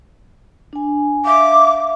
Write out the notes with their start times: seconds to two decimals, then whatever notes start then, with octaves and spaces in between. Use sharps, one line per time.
0.73 D4 G#5
1.25 E5 F5 D6